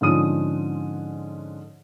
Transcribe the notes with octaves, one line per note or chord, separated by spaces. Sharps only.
G#2 D3 F3 C#4 D#6 D#7